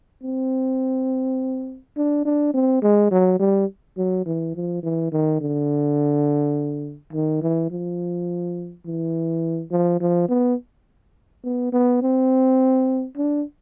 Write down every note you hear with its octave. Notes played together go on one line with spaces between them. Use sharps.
C4
D4
D4
C4
G#3
F#3
G3
F#3
E3
F3
E3
D#3
D3
D#3
E3
F3
E3
F3
F3
B3
B3
B3
C4
D4